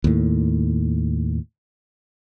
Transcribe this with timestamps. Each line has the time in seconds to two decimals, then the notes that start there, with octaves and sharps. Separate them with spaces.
0.04 D#2 A2